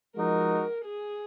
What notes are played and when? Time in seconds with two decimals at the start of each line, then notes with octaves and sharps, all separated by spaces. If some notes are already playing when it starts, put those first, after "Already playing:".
0.16 F3 G#3 D#4 F#4 A#4
0.85 G#4